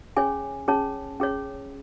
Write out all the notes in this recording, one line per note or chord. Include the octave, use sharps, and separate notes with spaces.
C#4 G#4 C#5 G#5
C#4 G#4 C#5 A5
C#4 G#4 C#5